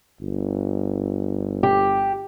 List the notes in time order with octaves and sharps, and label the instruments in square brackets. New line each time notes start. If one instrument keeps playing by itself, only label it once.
[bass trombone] G1
[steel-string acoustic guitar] G4